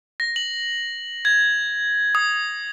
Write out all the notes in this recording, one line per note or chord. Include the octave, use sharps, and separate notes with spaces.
A#6
F#7
G#6
D#6